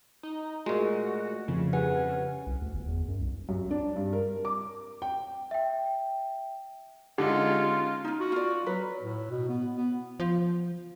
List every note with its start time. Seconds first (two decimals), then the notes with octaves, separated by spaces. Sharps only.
0.23 D#4
0.66 A#2 G#3 A3 F#4
1.48 F2 C#3
1.73 G2 B4 F#5 G#5
2.47 C2
2.62 D2
2.74 G1
2.87 E2
3.08 F#2
3.21 C2
3.49 F#2
3.71 D4
3.96 G2
4.13 A#4
4.45 D6
5.02 G5
5.51 E5 G5
7.18 D3 G#3 C#4 D#4 F4 G4
8.04 D#4 F4
8.20 F#4
8.32 F4 D5
8.66 F#3 B4
9.02 A2
9.30 B2
9.49 B3
9.75 B3
10.20 F3